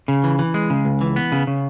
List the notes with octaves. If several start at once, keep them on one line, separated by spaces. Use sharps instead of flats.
C#3
E3
E3
G#3
C#3
C#2
E3
B3
C#3
C#3